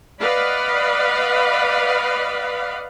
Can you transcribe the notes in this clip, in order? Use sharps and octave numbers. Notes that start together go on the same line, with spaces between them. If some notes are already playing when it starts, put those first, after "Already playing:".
B4 D5 D#5 F5 F#5 B5